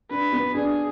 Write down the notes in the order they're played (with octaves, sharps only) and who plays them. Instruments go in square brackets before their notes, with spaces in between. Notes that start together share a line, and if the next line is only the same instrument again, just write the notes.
[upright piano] D4 [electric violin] B4
[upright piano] B3
[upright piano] D4 [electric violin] G#4